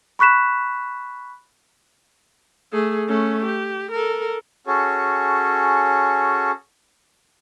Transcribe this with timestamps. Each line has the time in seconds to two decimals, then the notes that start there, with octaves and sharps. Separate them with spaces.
0.19 B5 C#6 F#6 B6 E7
2.72 A3 G#4
3.08 A3 C#4
3.45 G4
3.92 A4 A#4
4.67 C#4 F#4 G#4 A4 C#5